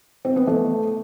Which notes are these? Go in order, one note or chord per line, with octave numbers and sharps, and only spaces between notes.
C4
B3
A3